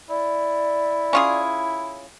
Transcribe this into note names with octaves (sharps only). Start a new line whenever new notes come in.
E4 D5
C#4 F4 G#4